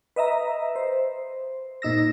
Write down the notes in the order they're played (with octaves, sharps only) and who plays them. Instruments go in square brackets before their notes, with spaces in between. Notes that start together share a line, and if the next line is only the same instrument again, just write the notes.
[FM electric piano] B4 D#5 E5 A#5
C5
A#2 D#4 E6 A#6